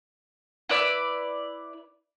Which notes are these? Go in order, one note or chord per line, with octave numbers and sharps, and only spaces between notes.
E4 B4 D5 E6